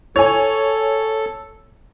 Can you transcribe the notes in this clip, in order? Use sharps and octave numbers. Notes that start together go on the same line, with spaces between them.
A4 C#5 G#5